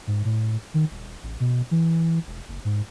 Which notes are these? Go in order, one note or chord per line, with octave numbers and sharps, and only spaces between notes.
G#2
A2
D#3
D#1
A1
B2
E3
E1
F#1
G#2